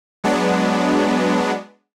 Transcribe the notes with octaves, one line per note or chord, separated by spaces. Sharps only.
F#3 G#3 B3 D4